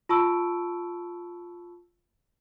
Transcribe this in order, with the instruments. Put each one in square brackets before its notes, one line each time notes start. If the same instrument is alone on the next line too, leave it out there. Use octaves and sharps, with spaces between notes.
[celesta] F4 A5 B5 C#6 E6 D7